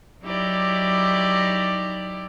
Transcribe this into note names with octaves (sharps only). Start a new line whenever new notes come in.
F#3 D#4 E4 G4 D5